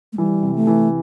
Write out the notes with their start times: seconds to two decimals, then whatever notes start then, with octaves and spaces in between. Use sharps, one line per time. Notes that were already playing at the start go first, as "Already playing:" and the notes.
0.13 A3
0.18 E3 G3
0.43 C3
0.55 A3
0.67 E3